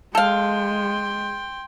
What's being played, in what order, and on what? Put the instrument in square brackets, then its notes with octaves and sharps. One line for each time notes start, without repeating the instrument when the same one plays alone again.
[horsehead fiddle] G#3 [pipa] A4 F5 [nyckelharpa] G5 C6